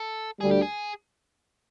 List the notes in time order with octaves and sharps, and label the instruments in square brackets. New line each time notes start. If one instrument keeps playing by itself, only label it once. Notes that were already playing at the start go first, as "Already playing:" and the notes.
Already playing: [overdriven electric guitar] A4
[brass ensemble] D2 D3 G3 [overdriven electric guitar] G#4
[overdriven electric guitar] G4
G#4